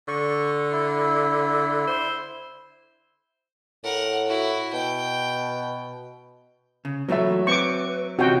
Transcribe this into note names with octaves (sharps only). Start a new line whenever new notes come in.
D3 C#6
E4
C5
A2 A#4 F#5
E4 F#4
B2 G5
C#3
A#2 E3 F#3 A3 F#4 E5
C4 B4 C#6 D6
C3 E3 C#4 F4 F#4 D#5 G5